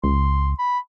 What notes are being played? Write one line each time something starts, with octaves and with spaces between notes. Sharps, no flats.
C#2 C6
B5